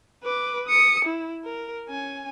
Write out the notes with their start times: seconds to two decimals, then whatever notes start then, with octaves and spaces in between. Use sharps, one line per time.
0.24 B4 D6
0.68 D#6 C#7
1.05 E4
1.45 A#4
1.89 C#4 G#5